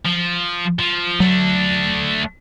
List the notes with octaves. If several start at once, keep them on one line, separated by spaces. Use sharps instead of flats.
F3
F3
F#3 A3 D4